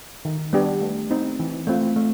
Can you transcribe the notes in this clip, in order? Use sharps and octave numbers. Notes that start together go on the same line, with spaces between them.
D#3
G3 B3 D4 G4
A3
C4 D#4
E3
A3 C4 F4
A3